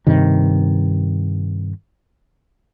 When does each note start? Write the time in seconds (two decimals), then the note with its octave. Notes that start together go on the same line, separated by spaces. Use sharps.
0.07 G2 C3 D#3